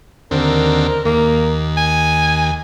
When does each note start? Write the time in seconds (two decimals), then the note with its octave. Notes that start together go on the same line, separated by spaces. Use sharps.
0.31 D#2 D3 C4 A#4
1.05 D#2 A#3
1.77 G#5